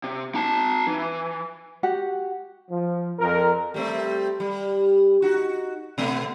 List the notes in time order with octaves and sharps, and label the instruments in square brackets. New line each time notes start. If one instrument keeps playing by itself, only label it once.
[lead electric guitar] C3
D#4 A5
E3
[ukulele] F#4 G4 F#5
[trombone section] F3
F2 A#4
[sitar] G3 A3 C4
G3
D#4 F#4
B2 A3 B3